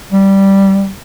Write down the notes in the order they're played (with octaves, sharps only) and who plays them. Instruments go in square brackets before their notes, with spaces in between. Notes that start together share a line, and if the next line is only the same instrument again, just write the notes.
[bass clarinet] G3